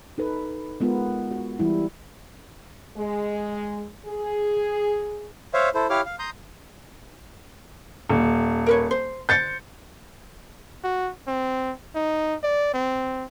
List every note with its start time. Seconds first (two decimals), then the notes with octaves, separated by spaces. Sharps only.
0.18 D#4 A4 B4
0.80 G#3 B3 F4 A#4
1.31 F#4
1.59 E3 G3 E4
2.97 G#3
4.06 G#4
5.54 C5 C#5 E5 F5
5.75 E4 A4 C5
5.90 E4 G4 C#5 F5 D6 F6
6.06 F5
6.19 A#5 C6 D#6 G6
8.09 D#1
8.66 A#4 B4 C#5
8.91 C5
9.29 C5 G6 A6 C#7
10.84 F#4
11.27 C4
11.95 D#4
12.43 D5
12.74 C4